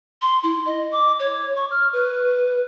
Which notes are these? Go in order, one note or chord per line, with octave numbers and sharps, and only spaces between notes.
C6
E4
D#5
D6
C#5
C#6
F6
B4